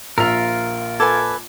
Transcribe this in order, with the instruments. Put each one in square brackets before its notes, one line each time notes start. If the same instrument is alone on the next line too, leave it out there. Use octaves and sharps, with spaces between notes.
[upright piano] A#1 F7 [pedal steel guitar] F4 A#4 [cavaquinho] E5
[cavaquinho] A4 B4 G#5 [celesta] A5 D6 G#6